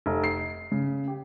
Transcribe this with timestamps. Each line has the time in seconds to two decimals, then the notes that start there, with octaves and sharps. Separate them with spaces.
0.06 F1
0.24 C7
0.72 C#3
1.08 G4